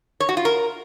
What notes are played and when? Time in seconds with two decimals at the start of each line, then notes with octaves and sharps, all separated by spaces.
0.20 C#5
0.29 F#4
0.37 F4
0.45 A#4